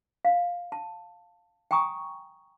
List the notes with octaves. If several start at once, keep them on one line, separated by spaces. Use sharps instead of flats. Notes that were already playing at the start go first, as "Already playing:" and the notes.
F5
A5
G5 G#5 A#5 C#6 D#6